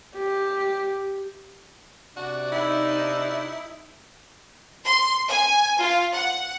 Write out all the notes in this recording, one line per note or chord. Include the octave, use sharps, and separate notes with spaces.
G4
C3 D4 F#4 D5
D#4 E4
C6
G#5
F4
F#5